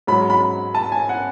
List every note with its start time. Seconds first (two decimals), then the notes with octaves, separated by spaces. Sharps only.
0.07 G#2 F#3 B5
0.30 B5
0.75 A5
0.92 G#5
1.09 F#5